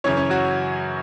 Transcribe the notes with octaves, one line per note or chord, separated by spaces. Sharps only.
F#2 C#3 E3 C#4 C#5
C#4 C#5
F#3 F#4